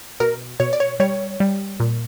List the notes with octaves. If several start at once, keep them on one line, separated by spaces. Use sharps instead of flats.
B2 A#4
B2 C#5
D5
C#5
G3 C#5
G3
A#2